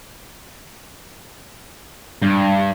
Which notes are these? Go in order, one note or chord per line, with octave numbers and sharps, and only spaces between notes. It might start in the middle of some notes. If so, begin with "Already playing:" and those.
G2